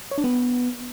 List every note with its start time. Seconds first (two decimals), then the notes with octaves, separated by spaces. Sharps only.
0.11 C#5
0.18 D4
0.24 B3